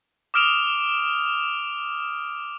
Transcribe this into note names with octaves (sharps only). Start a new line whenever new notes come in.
D6 D#6 F6 D7 E7 F7